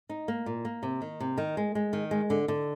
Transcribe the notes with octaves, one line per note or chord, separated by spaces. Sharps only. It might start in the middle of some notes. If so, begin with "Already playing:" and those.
D#4
A#3
A#2
A#3
C3
D#3
C3
D#3
G#3
G#3
D#3
G#3
D3
D3